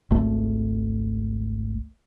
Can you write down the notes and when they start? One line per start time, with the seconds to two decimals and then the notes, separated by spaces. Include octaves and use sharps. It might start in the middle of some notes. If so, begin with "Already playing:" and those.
0.11 G#1 C#2 A3